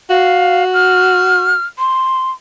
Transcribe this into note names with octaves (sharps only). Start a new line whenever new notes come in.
F#4 F5
F6
C6